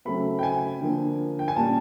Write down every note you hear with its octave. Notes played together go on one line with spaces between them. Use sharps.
C#3 F#3 A3 C4 B5
G5
G#5
D3 F3 A#3
G5
G#5
A#2 G3 A#3 C#4 A5